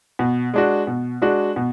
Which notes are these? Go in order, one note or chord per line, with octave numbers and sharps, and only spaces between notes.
B2
G#3 D4 F#4
B2
G#3 D4 F#4
B2